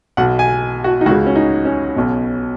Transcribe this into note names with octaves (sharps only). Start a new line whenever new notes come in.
B1 B2 F#5
G#5
F#4
D#4
C#2 F#4
C#3
C#4
D#4
C#4
B1 B2